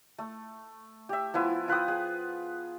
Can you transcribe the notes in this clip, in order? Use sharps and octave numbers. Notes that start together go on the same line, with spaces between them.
A3
G4 E5
F3 B3 E4 G#5
F4 B4 G5 D#6
G#4